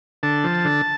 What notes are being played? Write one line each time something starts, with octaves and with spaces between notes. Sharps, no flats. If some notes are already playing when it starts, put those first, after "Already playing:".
D3 A5
F3
D3